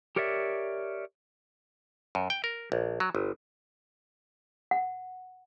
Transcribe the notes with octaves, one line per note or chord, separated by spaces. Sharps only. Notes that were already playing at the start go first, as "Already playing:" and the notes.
G4 A#4 C#5 D5 E5
F#2
G5
A#4
A#1
F#3
G1
F#5